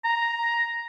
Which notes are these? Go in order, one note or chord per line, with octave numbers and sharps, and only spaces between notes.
A#5